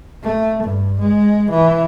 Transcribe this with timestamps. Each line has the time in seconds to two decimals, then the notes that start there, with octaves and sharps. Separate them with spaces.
0.23 A3
0.62 G2
0.99 G#3
1.50 E3